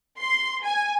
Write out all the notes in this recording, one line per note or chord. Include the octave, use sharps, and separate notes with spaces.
C6
G#5